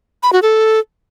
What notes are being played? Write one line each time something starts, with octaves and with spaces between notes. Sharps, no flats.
B5
F#4
A4